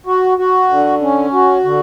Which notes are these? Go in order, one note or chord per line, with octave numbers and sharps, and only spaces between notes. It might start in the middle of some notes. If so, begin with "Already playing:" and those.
F#4
F#4
D3
C#4
F#4
D3